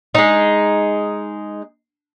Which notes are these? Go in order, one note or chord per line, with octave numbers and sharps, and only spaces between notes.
G#3 D#4